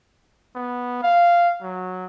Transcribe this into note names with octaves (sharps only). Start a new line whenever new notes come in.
B3
F5
F#3